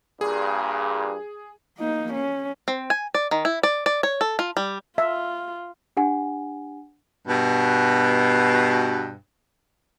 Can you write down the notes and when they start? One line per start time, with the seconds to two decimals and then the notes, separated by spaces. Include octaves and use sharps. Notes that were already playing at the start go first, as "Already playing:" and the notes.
0.21 G2 A#2 G#4
1.78 A#3 D#4
2.14 C#4
2.68 C4
2.90 G#5
3.15 D5
3.31 D#3
3.45 E4
3.63 D5
3.86 D5
4.03 C#5
4.21 A4
4.39 F4
4.57 G3
4.98 F4 E5
5.97 D4 G4 F#5 G#5
7.28 G2 B2